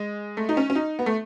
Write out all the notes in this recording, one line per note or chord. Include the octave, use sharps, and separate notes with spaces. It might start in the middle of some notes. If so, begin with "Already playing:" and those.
Already playing: G#3
A3
D#4
C#4
C#4
D#4
B3
A3